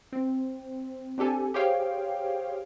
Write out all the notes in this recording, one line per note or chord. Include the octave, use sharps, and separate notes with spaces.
C4
C4 D4 G4 A4 G#5
G4 G#4 C5 C#5 F5 G5